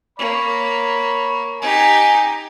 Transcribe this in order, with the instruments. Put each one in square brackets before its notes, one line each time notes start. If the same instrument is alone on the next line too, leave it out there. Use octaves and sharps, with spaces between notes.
[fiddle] A#3 [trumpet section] C#5 B5
[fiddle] D#4 G4 [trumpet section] G#5